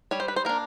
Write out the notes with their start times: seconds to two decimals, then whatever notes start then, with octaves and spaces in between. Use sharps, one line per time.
0.11 G3 C#5
0.20 C5
0.28 B4
0.36 C5
0.45 A#3 D4 A#4